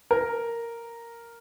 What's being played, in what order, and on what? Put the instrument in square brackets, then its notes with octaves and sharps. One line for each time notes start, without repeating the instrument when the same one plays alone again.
[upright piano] A#4